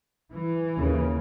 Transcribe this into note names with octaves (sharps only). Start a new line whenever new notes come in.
E3
D#2 C#3